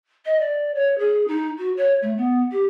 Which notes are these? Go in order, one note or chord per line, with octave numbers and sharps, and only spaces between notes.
D#5
D5
C#5
G#4
D#4
F#4
C#5
A3
B3
G4